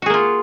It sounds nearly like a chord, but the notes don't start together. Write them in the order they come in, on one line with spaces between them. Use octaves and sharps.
F#4 G#4 A#3 F4